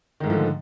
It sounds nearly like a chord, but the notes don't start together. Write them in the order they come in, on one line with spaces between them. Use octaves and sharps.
D#3 G#2 A3 F3 D3